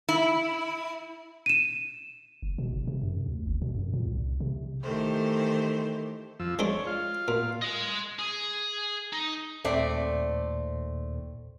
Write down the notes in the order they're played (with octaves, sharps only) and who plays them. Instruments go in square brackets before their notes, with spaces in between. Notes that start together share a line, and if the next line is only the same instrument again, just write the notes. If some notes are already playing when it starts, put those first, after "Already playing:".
[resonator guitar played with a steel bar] E4
[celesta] D#7 E7
[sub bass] F#1
B2
G1
C3
F#2
D2
G1
B2
F#2
A#2
C2
C3
[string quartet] D#3 E3 A3 G4 C5
[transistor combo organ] F2 F3 E6
[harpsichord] G#3 D4 C5 [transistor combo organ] C#5
[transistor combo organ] F4 F5
[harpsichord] A#2
[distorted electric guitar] D#5 C6
G#4
D#4
[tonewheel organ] D#2 A#2 [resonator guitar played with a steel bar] A3 C4 D5